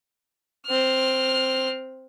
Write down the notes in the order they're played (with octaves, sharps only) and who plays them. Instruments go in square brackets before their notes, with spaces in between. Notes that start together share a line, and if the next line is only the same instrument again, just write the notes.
[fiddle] C4 F6